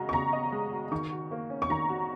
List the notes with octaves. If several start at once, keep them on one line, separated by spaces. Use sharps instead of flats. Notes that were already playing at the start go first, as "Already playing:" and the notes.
Already playing: C#3 G#3 F#4 D#5 A#5
C#6
C#3 A#5
D#5
G#3
F#4
D#3 C#6
F#4
A#3
C#4
C#6
D#3 A#5
F#4